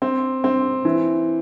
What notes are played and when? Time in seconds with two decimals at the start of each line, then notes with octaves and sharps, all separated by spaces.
0.02 C4
0.44 C4
0.85 E3